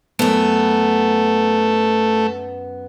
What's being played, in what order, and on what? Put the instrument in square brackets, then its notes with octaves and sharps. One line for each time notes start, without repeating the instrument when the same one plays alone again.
[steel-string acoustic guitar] F#2 B3 [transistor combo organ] A3